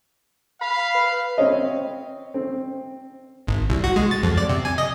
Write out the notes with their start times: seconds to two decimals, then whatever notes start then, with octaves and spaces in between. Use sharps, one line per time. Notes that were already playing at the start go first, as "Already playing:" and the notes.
0.61 F5 B5
0.95 B4
1.38 C4 C#5 D#5
2.34 C4
3.47 G#1
3.70 C2
3.84 F#4
3.96 G#3
4.11 A6
4.23 F2
4.38 D5
4.49 C3
4.65 G#5
4.78 D#5